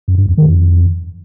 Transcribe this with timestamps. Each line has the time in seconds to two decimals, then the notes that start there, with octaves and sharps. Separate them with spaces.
0.08 F#2
0.18 G2
0.28 E2
0.38 D#3
0.47 F2